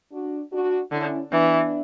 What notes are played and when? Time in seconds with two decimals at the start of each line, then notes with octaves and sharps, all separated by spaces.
0.12 D4 F#4
0.52 D4 F#4
0.91 D3 C#4 E4
1.31 E3 B3 D4